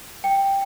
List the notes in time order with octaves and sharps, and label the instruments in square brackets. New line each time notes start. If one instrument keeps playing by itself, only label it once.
[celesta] G5